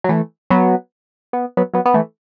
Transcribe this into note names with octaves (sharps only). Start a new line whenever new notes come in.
F#3
E3 A3
F#3 B3
B3
F#3 B3
F#3 B3
B3
E3 A3